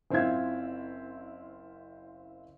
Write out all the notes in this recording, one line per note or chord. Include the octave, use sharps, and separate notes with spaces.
F#1 C4 E4 F4 G#6